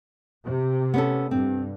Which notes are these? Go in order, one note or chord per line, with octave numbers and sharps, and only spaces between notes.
C3
B3 C#4 A4
G2 C4